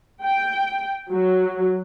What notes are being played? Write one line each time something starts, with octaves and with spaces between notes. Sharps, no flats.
G5
F#3